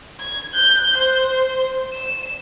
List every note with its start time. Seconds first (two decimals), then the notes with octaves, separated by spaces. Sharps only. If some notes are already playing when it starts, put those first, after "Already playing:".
0.20 G#6
0.53 F#6 G6
0.97 C5
1.93 E7